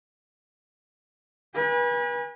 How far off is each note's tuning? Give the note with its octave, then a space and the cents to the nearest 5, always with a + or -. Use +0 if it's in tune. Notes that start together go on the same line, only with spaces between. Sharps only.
B4 -35 G#5 -30